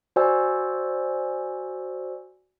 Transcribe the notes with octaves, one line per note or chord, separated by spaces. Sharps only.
F#4 C5 D5 G#5 E6